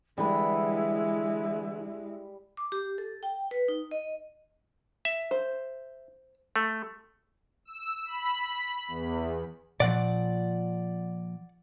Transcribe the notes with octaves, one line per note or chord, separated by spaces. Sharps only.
D3 E3 G3 G#3 E4 B5
D6
G4
A4
G5
B4
D#4
D#5
E5
C5
A3
E6
B5
E2
A#2 F3 D5 F#5